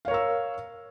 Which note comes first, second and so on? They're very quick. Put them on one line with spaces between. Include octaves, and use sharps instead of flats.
F5 C#5 A#4 E6